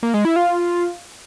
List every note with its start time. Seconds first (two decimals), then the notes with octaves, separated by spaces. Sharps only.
0.03 A#3
0.14 G#3
0.25 E4
0.36 F4